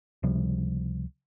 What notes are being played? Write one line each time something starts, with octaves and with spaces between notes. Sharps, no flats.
C#2 C3 F3 G3